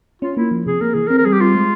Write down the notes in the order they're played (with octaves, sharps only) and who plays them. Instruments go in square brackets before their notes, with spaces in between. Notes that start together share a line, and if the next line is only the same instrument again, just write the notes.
[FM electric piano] C#4 [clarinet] F4
[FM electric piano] A#3 [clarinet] E4
[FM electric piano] F3
[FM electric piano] C3 [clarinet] G#4
[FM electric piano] A#3 [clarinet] A#4
[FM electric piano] E3 [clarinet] G#4
[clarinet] A#4
[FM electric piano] C4
[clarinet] A#4
[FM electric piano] G3 [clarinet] G#4
[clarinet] G4
[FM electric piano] C4 [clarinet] F4
[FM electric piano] G#3